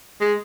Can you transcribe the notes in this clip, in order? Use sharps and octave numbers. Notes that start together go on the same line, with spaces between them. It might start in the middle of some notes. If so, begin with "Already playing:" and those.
G#3